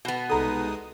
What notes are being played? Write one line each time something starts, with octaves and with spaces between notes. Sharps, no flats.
B2 B3
C2 G#3 D#4 A4 A#5 D#6